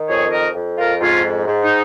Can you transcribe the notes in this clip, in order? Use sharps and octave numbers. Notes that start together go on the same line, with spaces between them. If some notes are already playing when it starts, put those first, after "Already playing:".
Already playing: D#3
F2 G#4 C#5
A#4 D#5
F2
F4 A#4
G#2 C#4 F4
G#2
D#4